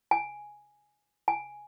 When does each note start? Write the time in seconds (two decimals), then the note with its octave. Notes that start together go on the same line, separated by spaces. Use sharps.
0.11 G#5
1.28 G#5